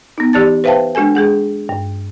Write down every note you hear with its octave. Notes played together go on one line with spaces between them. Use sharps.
B3 D#4
E3 G4 D5 A5 A6
B4 C5 E5 F5 G5 A5
G#3 D4 F#4 A4 G#5
G#3 G#4 F#5
G2